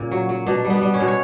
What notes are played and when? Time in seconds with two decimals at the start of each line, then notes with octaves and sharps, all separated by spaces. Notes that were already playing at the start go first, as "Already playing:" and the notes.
Already playing: A#2 C#3 A#3
0.11 F#3
0.29 F#3
0.47 B2 D4
0.65 G3
0.70 B3
0.81 G3
0.94 C#4
1.00 B2
1.08 C#5